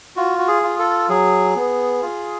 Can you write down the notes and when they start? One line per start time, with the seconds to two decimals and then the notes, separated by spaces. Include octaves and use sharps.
0.16 F4 F#4
0.39 F#4
0.48 G#4
0.63 F4
0.79 A4
1.09 F#3 G#4
1.56 B3
2.02 F4